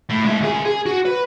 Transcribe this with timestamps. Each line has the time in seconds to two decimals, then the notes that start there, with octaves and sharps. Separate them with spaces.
0.09 A2
0.25 G#3 E5
0.40 C#2 G#4
0.65 G#4
0.86 F#4
1.05 B4